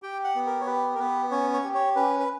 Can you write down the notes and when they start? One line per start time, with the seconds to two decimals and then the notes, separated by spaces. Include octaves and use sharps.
0.02 G4 G5
0.24 F#5
0.35 B3
0.46 A#4
0.61 C#5
0.67 G4 B4
0.95 A#4
0.99 B3 B4
1.31 C#4 C#5
1.53 C#5
1.64 G4
1.75 C#5
1.96 C#4 B4
2.20 B4